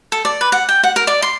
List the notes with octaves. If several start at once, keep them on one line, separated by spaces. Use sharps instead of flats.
A4
D5
B4
F#5
G5
F#5
A#4
D5
C6